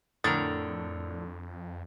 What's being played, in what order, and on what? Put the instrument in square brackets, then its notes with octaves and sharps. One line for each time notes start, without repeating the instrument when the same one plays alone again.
[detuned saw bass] F2 [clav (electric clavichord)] A2 A#4 [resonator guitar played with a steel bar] D3 [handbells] D#6 A6